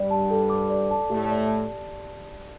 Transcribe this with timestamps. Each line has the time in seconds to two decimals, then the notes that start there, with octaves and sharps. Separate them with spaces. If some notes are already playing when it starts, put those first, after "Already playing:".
Already playing: G2 G3 D5
0.11 A5
0.31 A4
0.50 D6
0.70 D5
0.91 A5
1.10 A2 A3 G4
1.31 D5